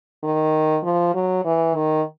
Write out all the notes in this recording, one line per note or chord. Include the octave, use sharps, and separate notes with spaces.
D#3
F3
F#3
E3
D#3